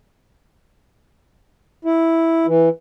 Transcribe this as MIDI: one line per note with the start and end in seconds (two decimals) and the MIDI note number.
1.85 2.46 64
2.46 2.69 52